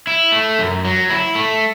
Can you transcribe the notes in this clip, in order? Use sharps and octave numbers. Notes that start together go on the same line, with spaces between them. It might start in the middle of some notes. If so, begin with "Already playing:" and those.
E4
A3
F#2
F#3
E4
A3